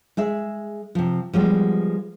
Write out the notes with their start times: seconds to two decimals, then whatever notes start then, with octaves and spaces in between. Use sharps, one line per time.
0.17 G#3 G#4 E5
0.95 C3 F3
1.33 F3 G3 G#3 B3